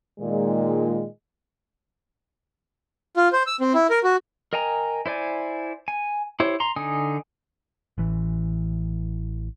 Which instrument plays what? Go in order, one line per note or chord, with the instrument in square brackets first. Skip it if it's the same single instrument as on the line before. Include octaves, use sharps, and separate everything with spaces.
[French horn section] A#2 D#3 G#3
[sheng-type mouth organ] F4
C5
E6
C4
E4
A#4
F#4
[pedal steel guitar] A#4 D#5 G5 G#5 A#5
E4 C5 D5 G#5
G#5
E4 G4 C5 C#5
A#5 C6
D3 D#4 G#5 D#6
[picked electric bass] A1 E3